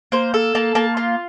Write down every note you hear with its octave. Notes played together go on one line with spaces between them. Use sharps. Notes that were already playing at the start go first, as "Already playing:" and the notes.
A#3 C5
A4
A#3 A5
A#3 A5
F4